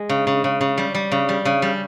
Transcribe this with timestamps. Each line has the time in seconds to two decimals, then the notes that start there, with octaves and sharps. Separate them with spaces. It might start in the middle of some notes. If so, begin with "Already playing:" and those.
Already playing: G#3
0.09 C#3
0.27 C#3
0.44 C#3
0.61 C#3
0.78 G3
0.95 G3
1.11 C#3
1.29 G3
1.45 C#3
1.62 G3